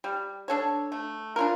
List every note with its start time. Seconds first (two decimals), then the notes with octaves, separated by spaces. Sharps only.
0.04 G3
0.48 D4 A4 C#5
0.92 A3
1.36 D4 F4 A#4